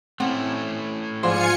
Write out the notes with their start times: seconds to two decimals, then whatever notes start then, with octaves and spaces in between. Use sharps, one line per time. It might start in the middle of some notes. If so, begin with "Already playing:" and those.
0.20 A3 C4 C#4 E4 F#5
1.23 G#2 F3 D4 F4 G#5 C6 C#7